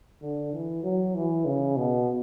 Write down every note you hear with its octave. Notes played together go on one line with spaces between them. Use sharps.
D3
E3
F#3
E3
C#3
B2